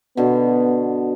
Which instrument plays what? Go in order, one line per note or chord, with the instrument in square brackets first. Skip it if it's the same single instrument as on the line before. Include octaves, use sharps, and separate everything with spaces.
[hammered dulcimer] B2 D3 [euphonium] B3